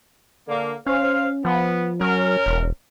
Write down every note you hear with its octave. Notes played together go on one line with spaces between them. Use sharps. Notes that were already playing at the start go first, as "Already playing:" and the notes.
D3 A#3
C#4 C5 F5
F3 B3
F#3 C#4 A#4
E1